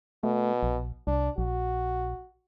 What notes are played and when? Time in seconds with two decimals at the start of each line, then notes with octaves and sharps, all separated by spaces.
0.24 B2 A3
0.63 A#1
1.07 C2 D4
1.38 A#1 F#4